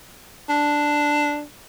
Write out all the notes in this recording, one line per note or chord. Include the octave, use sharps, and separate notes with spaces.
D4